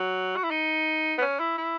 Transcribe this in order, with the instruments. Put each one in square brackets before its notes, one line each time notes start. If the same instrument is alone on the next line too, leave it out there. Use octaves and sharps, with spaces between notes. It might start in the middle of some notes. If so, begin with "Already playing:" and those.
Already playing: [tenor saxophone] F#3
F#4
E4
D#4
B3
C#4
E4
E4